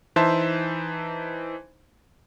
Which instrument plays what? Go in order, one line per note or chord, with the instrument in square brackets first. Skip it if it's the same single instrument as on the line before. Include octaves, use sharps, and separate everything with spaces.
[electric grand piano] E3 D#4 C5 E5 A5 C6